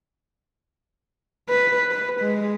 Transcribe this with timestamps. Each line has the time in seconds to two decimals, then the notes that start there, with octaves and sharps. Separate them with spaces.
1.50 B4
1.91 B4
2.21 G#3